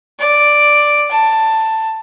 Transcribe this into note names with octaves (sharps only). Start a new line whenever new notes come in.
D5
A5